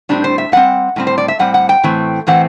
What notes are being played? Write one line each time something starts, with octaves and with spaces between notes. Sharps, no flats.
A2 G3 C4 D4
C5
E5
A2 G3 C4 F#5
A2 G3 C4
C5
D5
E5
A2 G3 C4 F#5
F#5
G5
A2 E3 A3 C4
A2 E3 A3 C4 F#5